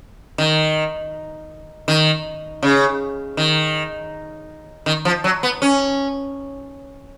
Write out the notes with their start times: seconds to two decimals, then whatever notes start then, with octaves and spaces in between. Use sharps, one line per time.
0.38 D#3
1.88 D#3
2.63 C#3
3.37 D#3
4.86 D#3
5.05 F3
5.24 F#3
5.43 B3
5.62 C#4